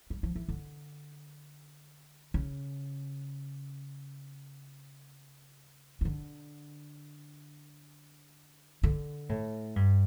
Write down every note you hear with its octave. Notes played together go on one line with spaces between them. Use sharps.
G3
F3
E3
D3
C#3
C#3
D3
D3
A2
G2